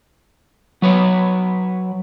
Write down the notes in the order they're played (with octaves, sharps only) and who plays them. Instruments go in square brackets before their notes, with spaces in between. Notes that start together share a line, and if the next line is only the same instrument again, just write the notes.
[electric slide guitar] F#3 B4 C#5